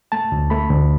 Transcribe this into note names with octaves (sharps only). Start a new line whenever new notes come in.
A3 A5
D2
A3 B5
D2